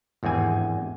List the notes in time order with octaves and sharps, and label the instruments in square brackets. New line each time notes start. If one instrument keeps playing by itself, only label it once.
[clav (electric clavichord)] G#1 E2 G2 C4 G#5